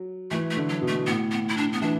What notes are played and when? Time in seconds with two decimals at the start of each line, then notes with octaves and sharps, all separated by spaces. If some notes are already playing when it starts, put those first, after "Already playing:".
Already playing: F#3
0.31 E3 A3
0.50 A3
0.57 D3
0.69 F#3
0.81 B2
0.88 A3
1.06 A2 B3
1.31 B3
1.48 E4
1.57 D4
1.73 B3
1.82 E3 D4